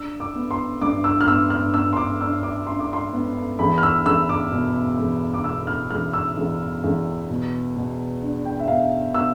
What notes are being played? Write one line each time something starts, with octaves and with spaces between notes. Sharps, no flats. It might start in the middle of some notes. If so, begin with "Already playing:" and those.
Already playing: D4 E6
D6
B3
C6
G2 D6
E6
F6
B3 E6
F6
B3 E6
C6
D6
D4 E6
D6
D4 C6
D6
C6
B3
E2 B5
F6
E6
E2 E6
D6
B2
E2
D6
B2 E6
F6
E2 F6
E6
E2
E2
B2
B2
D4
G5
E5
B2 F5
B2 E6